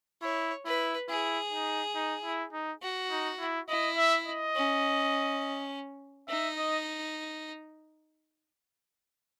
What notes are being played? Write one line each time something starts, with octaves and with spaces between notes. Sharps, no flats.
E4 C#5
E4 B4
E4 G#4
D#4
D#4
E4
D#4
F#4
D#4
E4
E4 D#5
E5
D#5
C#4
D#4 E5
D#5